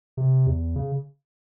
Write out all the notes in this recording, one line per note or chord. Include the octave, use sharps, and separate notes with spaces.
C3
E2
C#3